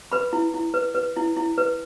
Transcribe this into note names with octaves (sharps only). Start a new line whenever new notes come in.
B4 B5
E4
E4
B4
B4
E4
E4
B4